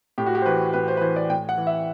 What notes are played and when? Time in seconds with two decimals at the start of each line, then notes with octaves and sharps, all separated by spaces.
0.18 A2 G4
0.26 F#4
0.35 G4
0.42 C5
0.46 E3 B4
0.73 A2 B4
0.88 C5
0.97 B4
1.01 E3 C5
1.16 D5
1.29 A2 G5
1.49 F#5
1.58 E3
1.67 E5